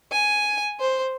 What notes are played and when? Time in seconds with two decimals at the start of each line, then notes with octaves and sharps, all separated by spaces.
0.12 G#5
0.79 C5